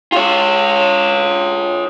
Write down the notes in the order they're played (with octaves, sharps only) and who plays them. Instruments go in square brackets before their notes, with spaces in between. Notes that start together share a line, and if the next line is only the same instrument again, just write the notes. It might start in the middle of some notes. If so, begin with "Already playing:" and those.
[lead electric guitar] F4 C#5